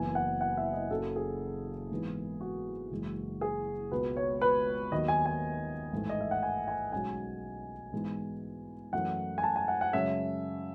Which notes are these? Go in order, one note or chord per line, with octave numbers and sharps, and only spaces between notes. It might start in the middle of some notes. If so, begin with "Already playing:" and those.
Already playing: F#1 F#2 E3 B3 G#5
F#5
F#5
E5
D#5
F#1 F#2 C#3 F#3 A4
G#4
G#2 E3 G#3 B3
F#4
F#1 F#2 E3 G#3
G#4
C#2 B2 G#3 B3 B4
C#5
B4
D#2 D#3 F#3 B3 D#5
G#5
G#5
A1 G#2 E3 A3
D#5
E5
F#5
G#5
G#5
B1 B2 G#3 C#4 G#5
G#2 E3 G#3 B3
F#2 E3 A3 C#4 F#5
G#5
A5
G#5
F#5
F#5
F#2 C#3 G#3 C#4 E5